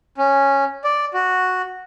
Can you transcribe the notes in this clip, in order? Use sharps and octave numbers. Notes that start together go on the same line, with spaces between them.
C#4
D5
F#4